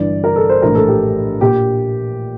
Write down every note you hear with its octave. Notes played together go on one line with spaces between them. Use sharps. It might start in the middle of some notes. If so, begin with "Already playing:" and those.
Already playing: G1 G2 E3 D5
A#4
A4
C5
A#1 A2 E3 A#4
A4
G4
A#2 G4